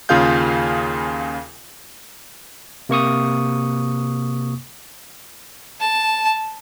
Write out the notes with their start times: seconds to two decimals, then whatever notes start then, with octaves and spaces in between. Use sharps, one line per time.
0.09 D#2 C#3 F4 G#4 F5 G6
2.89 C3 A#3 C#6 D#6
5.80 A5